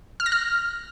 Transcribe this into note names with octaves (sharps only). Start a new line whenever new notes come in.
F6
A#6
F6